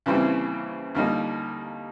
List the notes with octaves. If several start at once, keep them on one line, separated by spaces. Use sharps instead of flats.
D#2 C#3 E3 G3 C4
D#2 D3 G3 A#3 D#4